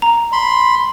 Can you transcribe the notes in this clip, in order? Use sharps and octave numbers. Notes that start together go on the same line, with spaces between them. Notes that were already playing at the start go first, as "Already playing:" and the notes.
A#5
B5 C6